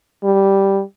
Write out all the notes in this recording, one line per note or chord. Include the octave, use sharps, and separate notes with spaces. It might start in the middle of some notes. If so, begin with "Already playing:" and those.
G3